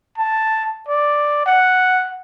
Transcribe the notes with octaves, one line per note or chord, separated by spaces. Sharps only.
A5
D5
F#5